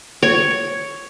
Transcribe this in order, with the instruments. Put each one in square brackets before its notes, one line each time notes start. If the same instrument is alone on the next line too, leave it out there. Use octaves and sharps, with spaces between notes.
[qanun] C#5